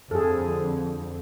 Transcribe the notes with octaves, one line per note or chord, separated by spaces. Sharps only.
F2 D3 G#4 A4